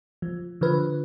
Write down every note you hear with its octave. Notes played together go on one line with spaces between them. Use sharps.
F3
D3 F3 B4